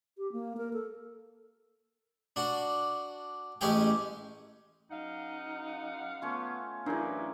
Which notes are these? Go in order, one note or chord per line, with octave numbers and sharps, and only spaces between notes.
G4
A#3
A#4
A4
D4 F#4
A1 G#3 C#4 G4 G#4 G5
F#2 D#4 F5 F#5
A3 B3 C#4 F4
F#2 A2 E3 A#3 D4 E4 G#4 B4